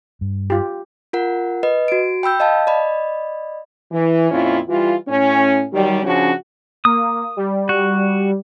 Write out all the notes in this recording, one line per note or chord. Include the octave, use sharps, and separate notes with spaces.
G2
F4 G4
F4 A#4 F#5
B4 D#5
F#4 D7
G5 B5 E6 G6
D#5 F5 A5
D5 D#5 B5
E3
F2 A#2 C#4 E4 F4
E3 G3 F4
A2 C#4
D#3 F#3 G3
C#3 F3 C#4 D4 F#4
A#3 D#6
G3
F#4